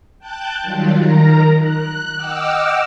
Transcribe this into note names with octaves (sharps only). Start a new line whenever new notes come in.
G5 A5 F#6 G6 A6
D#3 F#3 G3 F4
D#3 A#4 A#5
F#6
D#5 F#5 G5 D6 E6 F6